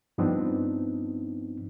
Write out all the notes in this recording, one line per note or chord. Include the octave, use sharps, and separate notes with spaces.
G2 F3 B3 C4 D4 D#4